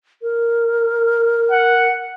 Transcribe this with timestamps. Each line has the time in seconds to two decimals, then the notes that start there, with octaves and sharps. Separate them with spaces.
0.22 A#4
1.51 F#5